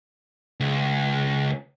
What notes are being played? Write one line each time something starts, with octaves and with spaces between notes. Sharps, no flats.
C#2